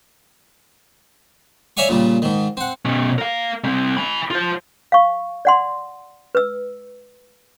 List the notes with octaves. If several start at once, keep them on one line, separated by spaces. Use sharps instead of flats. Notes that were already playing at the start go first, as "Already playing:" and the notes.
C#5 D5 E5 F5 G#5 C#6
A#2 C#3 G3
G#2 D#3
C4 F#5
B2 C#4
A#4 F5
G3 C4
G#5 B5
F4 C5
F5 C#6
D5 F#5 C6
B4 E6